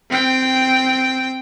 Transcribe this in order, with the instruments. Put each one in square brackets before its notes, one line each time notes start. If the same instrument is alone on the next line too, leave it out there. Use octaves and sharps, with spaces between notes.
[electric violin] C4 G5